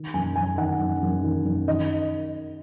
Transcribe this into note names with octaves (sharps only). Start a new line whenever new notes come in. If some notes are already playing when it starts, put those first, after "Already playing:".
Already playing: D#3
F#2 G#5
F#2 G#5
D#3 F#5
F#2
F#2
D#3
F#2
D#3 D#5